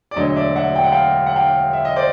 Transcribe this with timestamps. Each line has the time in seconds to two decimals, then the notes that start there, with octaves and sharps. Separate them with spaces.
0.11 D5
0.16 E1 D2 D3 F#3 C#5 D#5
0.27 D#5
0.35 D5 E5
0.56 E5 F#5
0.75 G5
0.84 F#5
0.92 F5 G5
1.26 F#5
1.36 F5 G5
1.73 E5
1.85 D#5
1.96 C5 D5